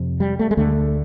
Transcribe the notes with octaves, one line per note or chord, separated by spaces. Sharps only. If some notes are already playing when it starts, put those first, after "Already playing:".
Already playing: F2 C3
G3
A3
G#3
D2 D3 A3